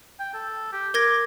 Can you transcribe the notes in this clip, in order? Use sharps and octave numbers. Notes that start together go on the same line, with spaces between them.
G5
A4
G4
A#4 D6 G#6 A#6